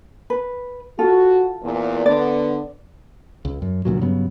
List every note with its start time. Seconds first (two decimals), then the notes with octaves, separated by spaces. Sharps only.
0.30 B4
0.99 F4 F#4 A4
1.62 E2 A#2
2.06 D3 B3 D5
3.45 C#2
3.62 F#2
3.85 F1 D2 A#2 F#3
4.01 G2 C#3 F#3 B3